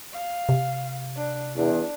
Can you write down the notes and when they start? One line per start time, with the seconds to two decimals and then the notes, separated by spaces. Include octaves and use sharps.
0.13 F5
0.49 C3
1.16 D4
1.55 E2 D4